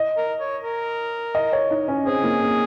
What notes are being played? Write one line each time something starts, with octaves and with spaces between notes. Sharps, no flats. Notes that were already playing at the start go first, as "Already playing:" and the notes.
Already playing: D#5
A#4
C#5
A#4
D#5
C#5
D#4
C#4
C4 G#4
A#3
C4